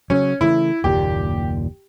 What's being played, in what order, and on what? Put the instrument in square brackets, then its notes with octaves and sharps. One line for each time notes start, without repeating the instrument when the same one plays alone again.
[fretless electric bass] C#3 F#3 [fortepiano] C#4
[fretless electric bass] C#3 E3 A3 [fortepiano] E4
[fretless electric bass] F#1 D#2 A#2 [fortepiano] G4